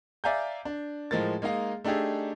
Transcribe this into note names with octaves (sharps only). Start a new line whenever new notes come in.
D5 E5 F5 G#5 A#5 G6
D4
A2 F3 G#3 A#4 A6
G#3 A#3 D#4 D#5 F5
A3 D4 D#4 G4 G#4